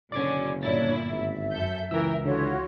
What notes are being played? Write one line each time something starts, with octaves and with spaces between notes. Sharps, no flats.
F#1 B2 D3 C#4 D5 D6 G#6
G1 A#2 A#3 D4 E4 C#5 D5 A6
G#1 E5
F#2 A4 G6
C#2 E3 A#4 G5 E6
D3 E3 F4 F#4 C#5